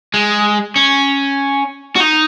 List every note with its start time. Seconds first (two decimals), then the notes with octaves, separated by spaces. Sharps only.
0.14 G#3
0.76 C#4
1.96 F#4
2.00 D#4